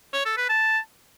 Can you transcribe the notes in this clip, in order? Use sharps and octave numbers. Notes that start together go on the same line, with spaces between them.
C#5
A4
B4
A5